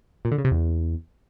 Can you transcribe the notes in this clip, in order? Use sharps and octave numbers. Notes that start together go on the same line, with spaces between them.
A#2
D3
C#3
C3
E2